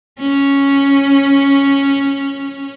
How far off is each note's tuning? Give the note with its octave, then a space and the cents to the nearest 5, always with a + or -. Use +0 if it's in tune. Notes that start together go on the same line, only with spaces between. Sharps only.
C#4 +0